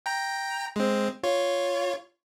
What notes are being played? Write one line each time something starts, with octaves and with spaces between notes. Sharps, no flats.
G5 A#5
G#3 C4
F4 C#5